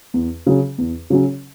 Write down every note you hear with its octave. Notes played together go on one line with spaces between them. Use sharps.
E2
C#3 F#3 C#4
E2
C#3 F#3 C#4